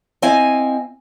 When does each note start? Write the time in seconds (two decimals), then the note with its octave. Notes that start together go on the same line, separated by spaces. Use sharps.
0.22 C4 E4 D#5 F5 G#5